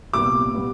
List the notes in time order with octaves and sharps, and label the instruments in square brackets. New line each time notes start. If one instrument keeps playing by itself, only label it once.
[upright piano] C2 A#2 G3 B3 [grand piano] D6
[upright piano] A#2 G3 B3